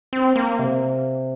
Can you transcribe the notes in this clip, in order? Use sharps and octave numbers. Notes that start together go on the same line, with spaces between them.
C4
A#3
C3